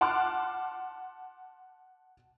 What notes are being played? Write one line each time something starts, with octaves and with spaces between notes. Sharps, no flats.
F#5 A5 C6 D6 F6 F#6